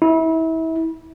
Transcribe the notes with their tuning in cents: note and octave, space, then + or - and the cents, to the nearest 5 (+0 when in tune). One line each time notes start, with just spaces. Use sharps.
E4 -30